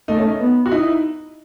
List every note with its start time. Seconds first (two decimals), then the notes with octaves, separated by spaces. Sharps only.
0.08 A3 D#4
0.19 C#4
0.29 D#4
0.40 B3
0.66 F#4
0.72 D#4 E4